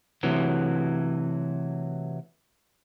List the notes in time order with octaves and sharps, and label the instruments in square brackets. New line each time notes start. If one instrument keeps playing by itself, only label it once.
[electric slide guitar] C3 E3 F#3 A3